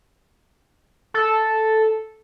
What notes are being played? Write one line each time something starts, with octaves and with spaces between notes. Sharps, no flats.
A4